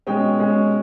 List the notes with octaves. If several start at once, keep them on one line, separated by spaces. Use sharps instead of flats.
B2 G#3 C#4 G5
B2 G#3 C#4